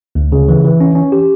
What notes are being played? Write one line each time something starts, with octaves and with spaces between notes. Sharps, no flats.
D2
C#3
E3
E3
C#4
C#4
G4